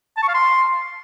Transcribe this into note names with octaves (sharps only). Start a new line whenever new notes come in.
A5
C#6
F5
C6